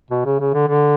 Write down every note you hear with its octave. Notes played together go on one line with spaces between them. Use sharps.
B2
C#3
C#3
D3
D3